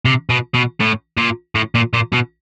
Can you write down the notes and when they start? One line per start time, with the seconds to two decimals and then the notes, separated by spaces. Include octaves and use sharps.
0.05 C3
0.30 B2
0.55 B2
0.80 A2
1.18 A#2
1.55 A2
1.75 A#2
1.93 A#2
2.13 B2